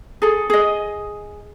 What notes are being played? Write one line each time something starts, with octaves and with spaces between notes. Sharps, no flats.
G#4 A4
G#4 D#5